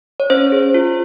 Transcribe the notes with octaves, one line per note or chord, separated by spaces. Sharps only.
C#5
C#4 C5
G#4
F4